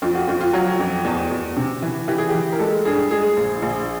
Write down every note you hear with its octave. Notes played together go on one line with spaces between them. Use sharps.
F2 F4
F#4
F2 F4
F4
F#3 F#4
F2
E2
E2
C3
E3
E3 G4
G#4
E3 G4
A#4
G#3 A4
G2 G#4
G#3 G#4
A#1
A#1